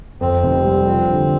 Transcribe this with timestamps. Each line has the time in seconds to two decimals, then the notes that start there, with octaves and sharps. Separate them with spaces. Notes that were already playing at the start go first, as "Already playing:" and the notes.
0.21 F2 C4
0.43 F1
0.64 G3
0.87 F3
1.09 D3